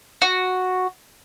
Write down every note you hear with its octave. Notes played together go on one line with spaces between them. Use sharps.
F#4